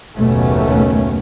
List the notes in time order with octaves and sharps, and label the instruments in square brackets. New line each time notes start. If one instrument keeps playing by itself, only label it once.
[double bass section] F#1 D#2 B2 A3 C#4